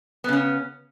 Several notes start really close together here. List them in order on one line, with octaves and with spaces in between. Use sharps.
B3 C#3 C#4